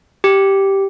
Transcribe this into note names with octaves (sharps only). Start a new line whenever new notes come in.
G4